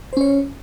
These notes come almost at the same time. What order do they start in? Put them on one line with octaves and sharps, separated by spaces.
C5 C#4 C#5